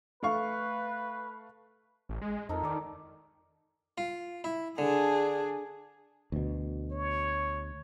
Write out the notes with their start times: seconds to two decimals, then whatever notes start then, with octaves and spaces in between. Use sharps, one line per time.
0.23 A3 B4 F5 C#6
2.09 A1
2.22 G#3
2.49 F2 D#4 A4 A#4
2.63 D#3 A4 D5
3.98 F4
4.44 E4
4.78 D3 D4 G#4
6.32 D2 B2
6.91 C#5